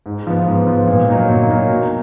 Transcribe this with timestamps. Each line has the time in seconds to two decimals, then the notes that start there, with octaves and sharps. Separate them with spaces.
0.06 G#2
0.27 F3 B3
0.47 G#2
0.67 F3 B3
0.87 A#2
1.08 F#3 A#3 D#4
1.29 A#2
1.49 F#3 A#3 D#4
1.70 B2